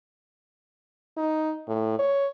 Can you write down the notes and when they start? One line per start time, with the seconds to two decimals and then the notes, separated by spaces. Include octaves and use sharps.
1.17 D#4
1.68 A2
1.99 C#5